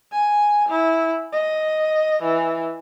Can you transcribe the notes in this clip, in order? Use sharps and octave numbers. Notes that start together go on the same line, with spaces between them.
G#5
E4
D#5
E3